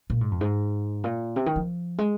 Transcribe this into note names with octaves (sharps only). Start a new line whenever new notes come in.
A#2
G#2
F2
G#2
A#2
C3
D#3
F3
G#3